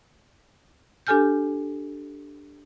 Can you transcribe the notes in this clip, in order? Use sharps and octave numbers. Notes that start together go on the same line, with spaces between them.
D4 G4 A4 G#5 F6 G6